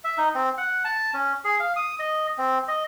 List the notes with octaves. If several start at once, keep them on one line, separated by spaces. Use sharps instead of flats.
E5
D#4
C4
F#5
A5
C#4
G#4
F5
D#6
D#5
C4
D#5